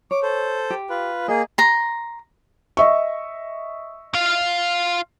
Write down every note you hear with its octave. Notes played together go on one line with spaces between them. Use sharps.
C#5 D6
A4 C5
G4
F4 B4
A#3 G#4 D#5
A#5 C6
D#5 E5 C#6
F4 F5